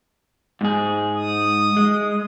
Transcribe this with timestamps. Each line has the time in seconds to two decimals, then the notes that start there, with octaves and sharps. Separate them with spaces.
0.61 G#2 G#4
1.14 D#6
1.77 G#3